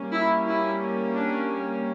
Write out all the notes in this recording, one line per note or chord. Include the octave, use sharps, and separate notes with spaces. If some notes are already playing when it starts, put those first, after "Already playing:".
Already playing: G3 A#3 C#4
E4
E4
D4